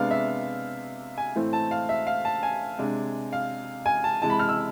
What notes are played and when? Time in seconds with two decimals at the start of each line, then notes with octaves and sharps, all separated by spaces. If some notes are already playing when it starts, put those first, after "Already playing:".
Already playing: C3 G#3 B3 D4 F5
0.11 E5
1.18 G#5
1.35 A2 E3 A3 C4
1.53 A5
1.71 F5
1.89 E5
2.07 F5
2.25 A5
2.43 G#5
2.79 C3 G#3 D4
3.33 F5
3.86 G#5
4.04 A5
4.22 C3 E3 G#3 A5
4.30 B5
4.39 F6
4.49 E6